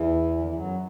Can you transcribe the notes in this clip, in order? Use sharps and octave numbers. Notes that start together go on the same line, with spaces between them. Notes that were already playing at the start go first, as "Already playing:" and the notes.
Already playing: E2 E3
D3
E3
F#2 F#3